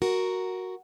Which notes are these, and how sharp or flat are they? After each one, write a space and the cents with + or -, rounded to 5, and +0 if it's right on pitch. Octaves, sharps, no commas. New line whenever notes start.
F#4 +0 A#4 +0